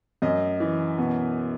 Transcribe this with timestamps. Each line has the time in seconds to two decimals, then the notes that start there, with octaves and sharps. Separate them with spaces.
0.22 F#2 D#5
0.60 E3
0.98 B2